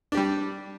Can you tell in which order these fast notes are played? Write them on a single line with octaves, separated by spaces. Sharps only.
D4 G4 G3